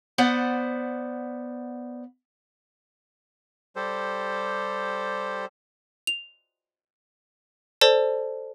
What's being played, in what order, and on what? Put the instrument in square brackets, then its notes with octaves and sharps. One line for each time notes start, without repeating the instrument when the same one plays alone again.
[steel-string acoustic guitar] B3 C5 D5 F#5
[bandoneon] G3 G4 A4 C5
[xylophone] F7
A4 C5 D5 A5